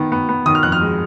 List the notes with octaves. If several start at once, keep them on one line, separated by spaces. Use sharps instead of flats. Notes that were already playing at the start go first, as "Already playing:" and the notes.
Already playing: D#3 B3
B3
B3
D#3 D#6
F6
F2 F#6
F6
G#3